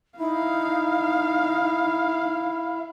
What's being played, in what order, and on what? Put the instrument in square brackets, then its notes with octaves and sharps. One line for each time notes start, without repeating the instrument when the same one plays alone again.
[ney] D#4 [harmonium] E4 [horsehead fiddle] F5